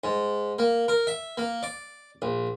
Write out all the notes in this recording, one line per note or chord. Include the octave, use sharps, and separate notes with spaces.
G#2
A#3
A#4
E5
A#3
D5
A#1